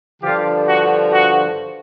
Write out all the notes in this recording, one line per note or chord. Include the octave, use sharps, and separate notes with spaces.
G2 D3 F3 F4 G4
F#4
F#4